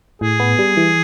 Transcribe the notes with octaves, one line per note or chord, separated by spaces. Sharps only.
A2 G#4
B3
G3
E3